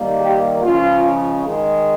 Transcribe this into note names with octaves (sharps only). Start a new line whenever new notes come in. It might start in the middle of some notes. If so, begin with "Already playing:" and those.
Already playing: D#3 G3 A#3
G4
C#3 F3 G#3 F4
D#3 G#3